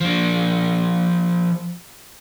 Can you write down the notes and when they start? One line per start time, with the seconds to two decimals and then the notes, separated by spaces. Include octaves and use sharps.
0.01 F3 D4